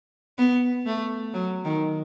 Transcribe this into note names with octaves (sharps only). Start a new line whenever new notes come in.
B3
A3
F#3
D#3